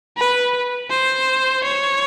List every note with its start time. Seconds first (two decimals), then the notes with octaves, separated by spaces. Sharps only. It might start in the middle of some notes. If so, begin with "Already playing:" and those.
0.18 B4
0.91 C5
1.64 C#5